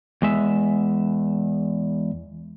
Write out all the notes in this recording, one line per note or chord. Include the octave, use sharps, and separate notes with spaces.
E2 G#3 E5